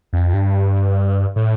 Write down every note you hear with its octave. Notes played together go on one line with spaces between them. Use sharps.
F2
G2
A2